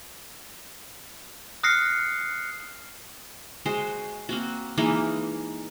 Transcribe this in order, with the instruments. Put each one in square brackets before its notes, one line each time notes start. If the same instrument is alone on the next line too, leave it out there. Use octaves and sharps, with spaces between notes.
[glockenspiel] D#6 F6 F#6 A#6 C7 C#7
[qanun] G#3 F#4 C5
A#3 C4 F#4
E3 G#3 A#3 D#4